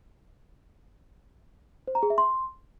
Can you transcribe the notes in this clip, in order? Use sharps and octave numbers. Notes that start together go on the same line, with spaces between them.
C5
A#5
G#4
E5
C6